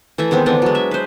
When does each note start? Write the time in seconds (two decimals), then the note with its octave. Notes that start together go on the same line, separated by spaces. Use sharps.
0.18 E3 A3 E5
0.31 D#3 G#3 B3 C4
0.46 D3 E3 B3 D4
0.62 F#3 G#3
0.75 E5
0.91 B4 C5